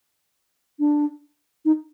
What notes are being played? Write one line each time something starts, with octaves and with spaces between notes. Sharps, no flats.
D4
D#4